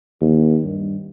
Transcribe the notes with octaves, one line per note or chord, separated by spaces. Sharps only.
D#2
G2